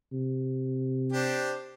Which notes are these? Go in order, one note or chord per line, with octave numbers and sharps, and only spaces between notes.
C3
D4 G4 C5